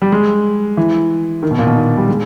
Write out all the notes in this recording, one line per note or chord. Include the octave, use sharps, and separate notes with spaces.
G3
G#3
E3
D#3
B2
A#2
B2
D#3
G3
G#3